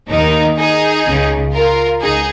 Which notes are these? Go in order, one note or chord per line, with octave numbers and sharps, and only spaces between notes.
D#2 D#3 D#4
D#4 G#4
C#2 C#3
F4 A#4
C#2 D#4 G#4